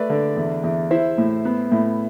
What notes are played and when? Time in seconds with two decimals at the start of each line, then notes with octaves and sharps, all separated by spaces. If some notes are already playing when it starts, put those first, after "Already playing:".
Already playing: A3 B4 D5
0.10 D3
0.37 E2
0.63 E2
0.91 E4 C5 E5
1.18 A2
1.45 B3
1.71 A2